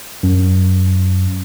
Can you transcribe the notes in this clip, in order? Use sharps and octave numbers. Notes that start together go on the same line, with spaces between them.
F#2